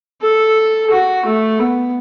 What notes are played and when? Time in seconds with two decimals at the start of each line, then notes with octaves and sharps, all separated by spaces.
0.22 A4
0.91 F#4
1.26 A3
1.60 B3